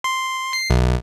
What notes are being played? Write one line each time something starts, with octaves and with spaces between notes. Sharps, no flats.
C6
C7
B1